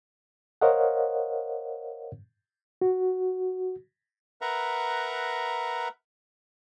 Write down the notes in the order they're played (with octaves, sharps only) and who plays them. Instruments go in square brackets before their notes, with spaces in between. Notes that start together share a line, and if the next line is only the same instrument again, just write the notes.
[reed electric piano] A#4 C5 C#5 D#5 F5 F#5
F#4
[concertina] A#4 B4 E5 F#5 A#5